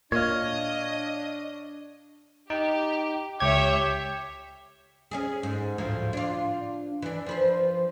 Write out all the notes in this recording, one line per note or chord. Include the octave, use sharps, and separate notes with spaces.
A#2 D4 C#5 D#5 F5
D#4 G4
C#2 G4 C#5 E5 G#6
C#4 D4 G#4
G#2
D2 A2 F3
D4 F4
E3 D4
F3 B4 C5